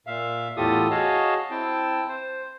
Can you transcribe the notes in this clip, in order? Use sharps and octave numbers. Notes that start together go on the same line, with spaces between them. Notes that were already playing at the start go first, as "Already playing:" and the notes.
A#2 E5 F5
E2 A2 F4 G4 A4 D#6
F#4 G#4 C#5 D#5 F5 A5
C4 E4 G5 A5
C5